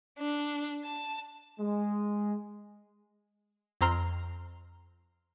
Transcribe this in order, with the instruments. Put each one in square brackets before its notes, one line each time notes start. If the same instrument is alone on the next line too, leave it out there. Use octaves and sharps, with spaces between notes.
[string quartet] D4
A5
[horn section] G#3
[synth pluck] F2 C4 A#5 C6 F6